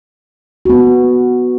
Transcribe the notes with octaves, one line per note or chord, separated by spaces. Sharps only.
B3 F#4